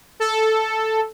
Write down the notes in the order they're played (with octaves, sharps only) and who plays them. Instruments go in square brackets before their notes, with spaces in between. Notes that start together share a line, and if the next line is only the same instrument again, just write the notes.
[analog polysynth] A4